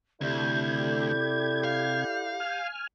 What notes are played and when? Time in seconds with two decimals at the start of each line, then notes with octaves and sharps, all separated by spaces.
0.21 D2 C3 E4 G4 A4 D5 G6 G#6
1.64 F5
2.40 G#5 F6